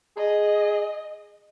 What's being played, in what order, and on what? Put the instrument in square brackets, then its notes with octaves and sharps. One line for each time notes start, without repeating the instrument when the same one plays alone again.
[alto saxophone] G#4 [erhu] D#5